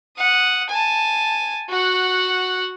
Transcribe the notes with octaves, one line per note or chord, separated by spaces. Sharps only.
F#5 D#6
G#5 A5
F#4 F#5